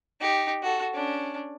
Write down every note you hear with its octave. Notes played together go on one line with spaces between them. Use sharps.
D#4 G4
F#4 A4
C#4 D4